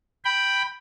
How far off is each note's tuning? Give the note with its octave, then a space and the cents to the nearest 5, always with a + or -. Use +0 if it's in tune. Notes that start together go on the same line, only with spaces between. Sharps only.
G5 +0 B5 +0